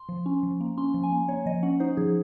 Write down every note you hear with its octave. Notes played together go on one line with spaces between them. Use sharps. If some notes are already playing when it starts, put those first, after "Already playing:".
Already playing: C6
F3
C#4
F3
A#3
C#4 C6
F3
G#5
A#3
A#3 C#5
F3 D#5
C#4 F#5
D#4 C5
F3 G#4